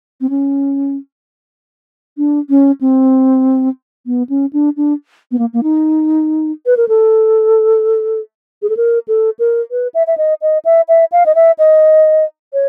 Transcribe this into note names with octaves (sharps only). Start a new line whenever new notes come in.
C4
C#4
D4
C#4
C4
B3
C#4
D4
D4
B3
A#3
A#3
D#4
B4
A#4
A4
G#4
A4
A#4
A4
A#4
B4
E5
E5
D#5
D#5
E5
E5
F5
D#5
E5
D#5
C#5